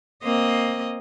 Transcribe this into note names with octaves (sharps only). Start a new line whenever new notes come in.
A#3 C4 D#5